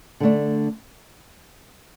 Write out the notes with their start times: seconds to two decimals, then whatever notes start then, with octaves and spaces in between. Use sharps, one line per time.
0.20 D3 A3 D4